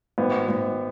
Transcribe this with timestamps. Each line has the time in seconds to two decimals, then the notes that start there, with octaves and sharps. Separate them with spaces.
0.18 G#1 B3
0.48 G#1